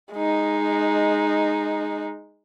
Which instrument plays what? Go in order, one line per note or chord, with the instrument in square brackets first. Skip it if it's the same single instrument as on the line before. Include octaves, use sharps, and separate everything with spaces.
[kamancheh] G#3 D#4